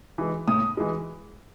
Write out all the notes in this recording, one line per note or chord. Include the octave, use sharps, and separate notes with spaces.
E3 G#3
A2 D#6
E3 G#3